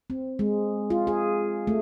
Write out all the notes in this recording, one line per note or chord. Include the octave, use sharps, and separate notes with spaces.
C4
G#3
F4
G#4
A3